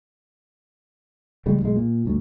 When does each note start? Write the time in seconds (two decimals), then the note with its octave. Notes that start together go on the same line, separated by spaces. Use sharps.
1.46 A1 C#3 G3 G#3
1.61 B1 G#2 G#3
1.76 A#2
2.05 G1 D2